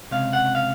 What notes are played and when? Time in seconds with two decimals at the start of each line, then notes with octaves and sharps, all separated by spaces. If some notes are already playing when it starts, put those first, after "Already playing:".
0.11 C#2 C3 F5
0.33 F#5
0.55 F5